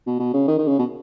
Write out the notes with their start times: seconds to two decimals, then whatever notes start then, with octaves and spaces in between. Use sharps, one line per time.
0.07 B2
0.19 B2
0.34 C#3
0.48 D#3
0.58 D#3
0.67 C#3
0.79 B2